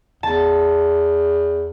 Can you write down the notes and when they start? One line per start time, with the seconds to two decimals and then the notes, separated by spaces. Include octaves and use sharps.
0.23 E2 A5